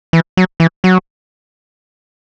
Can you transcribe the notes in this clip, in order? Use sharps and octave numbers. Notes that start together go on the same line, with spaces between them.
E3
F#3
E3
F#3